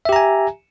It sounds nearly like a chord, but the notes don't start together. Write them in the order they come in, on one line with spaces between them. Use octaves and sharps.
E5 G4 A#5 G#5